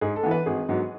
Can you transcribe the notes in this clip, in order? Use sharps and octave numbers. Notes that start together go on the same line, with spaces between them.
G#2 G#4
A4
E3 B3
B4
G#1 G#4
G#2 F#3 B3